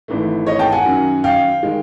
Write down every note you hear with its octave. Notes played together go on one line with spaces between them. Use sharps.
G#1 G#2 E3 A3
C#5 D#5
G5 A5
F#5 G#5
F#2 D#3 F#3
F5 G5
D#3 G#3